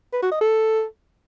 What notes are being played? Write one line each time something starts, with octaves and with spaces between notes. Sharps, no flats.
B4
F#4
D#5
A4